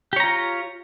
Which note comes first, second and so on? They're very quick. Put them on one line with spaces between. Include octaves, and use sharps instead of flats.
G4 C#5 A#5 F4